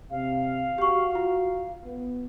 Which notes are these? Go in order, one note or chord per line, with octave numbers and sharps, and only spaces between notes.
C3 F5
F#4 G4 C#6
F4
B3